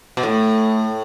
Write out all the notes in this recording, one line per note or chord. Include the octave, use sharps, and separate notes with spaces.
B2
A2 A3